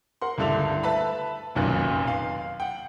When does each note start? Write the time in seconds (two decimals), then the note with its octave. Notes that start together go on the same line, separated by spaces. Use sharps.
0.22 A#4 F#5 C6
0.38 C#2 G2 D3 E4 A4 F7
0.83 B4 E5 A5 B5
1.55 F1 B1 F#2 A#2 D#3 F#6
2.07 F5
2.60 F#5 G5